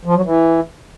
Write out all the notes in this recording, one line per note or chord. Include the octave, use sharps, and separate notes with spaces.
F3
F#3
E3